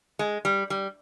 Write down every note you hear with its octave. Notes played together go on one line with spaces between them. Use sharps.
G#3
G3
G3